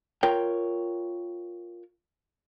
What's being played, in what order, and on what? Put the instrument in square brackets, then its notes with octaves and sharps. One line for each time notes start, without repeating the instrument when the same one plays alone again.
[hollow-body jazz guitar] F4 A#4 C#5 G5